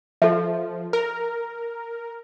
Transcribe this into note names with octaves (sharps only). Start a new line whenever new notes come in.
F3 A4 E5
A#4